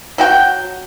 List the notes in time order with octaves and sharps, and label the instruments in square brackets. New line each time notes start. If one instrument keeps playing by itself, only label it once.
[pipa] F#3 F#4 G5